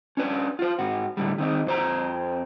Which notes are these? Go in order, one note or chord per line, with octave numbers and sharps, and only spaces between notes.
C#4 D4 B4
F4 C5
G#2 F#4
A2 D3 G3
D#3 C4 D#4
F2 C5 A#5